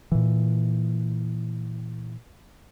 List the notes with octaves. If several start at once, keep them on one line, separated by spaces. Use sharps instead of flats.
A#2 E3